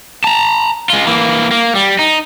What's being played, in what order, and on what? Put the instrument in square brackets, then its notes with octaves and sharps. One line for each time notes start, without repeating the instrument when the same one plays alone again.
[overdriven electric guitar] A5 A#5
G#3 F4
E3 A#3
A#3
G3
D#4